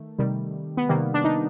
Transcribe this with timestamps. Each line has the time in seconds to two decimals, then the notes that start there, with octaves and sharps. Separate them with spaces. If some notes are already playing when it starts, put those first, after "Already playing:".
Already playing: D#3 A3
0.18 C3 D#3 G3
0.77 B3
0.89 C3 D#3 G3 A#3
1.14 D4
1.24 D#4